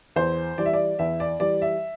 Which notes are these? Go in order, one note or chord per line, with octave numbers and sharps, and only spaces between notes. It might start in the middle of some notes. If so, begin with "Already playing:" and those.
E2 C5
E3 G3 D5
E5
D5
E2 E5
D5
E3 G3 D5
E5